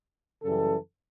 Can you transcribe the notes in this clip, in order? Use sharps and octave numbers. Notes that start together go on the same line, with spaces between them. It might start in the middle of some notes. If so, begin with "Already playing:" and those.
F#2 C#3 E3 G3 A4